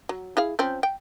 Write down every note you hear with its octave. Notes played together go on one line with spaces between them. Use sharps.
F#3
E4 G#4 F5
F3 C4 C#4
G5